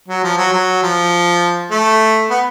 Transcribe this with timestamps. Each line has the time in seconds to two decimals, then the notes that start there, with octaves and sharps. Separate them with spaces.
0.08 F#3
0.24 F3
0.37 F#3
0.52 F#3
0.83 F3
1.71 A3
2.30 B3